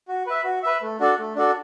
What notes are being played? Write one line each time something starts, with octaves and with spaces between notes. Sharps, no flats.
F#4
B4 E5
F#4
B4 E5
A3
D4 F#4 A4 D5
A3
D4 F#4 A4 D5